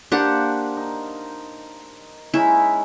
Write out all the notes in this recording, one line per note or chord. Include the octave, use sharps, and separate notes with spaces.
A#3 D4 G4 C5 F5 F#5
D#4
G#3 C#4 D#4 E4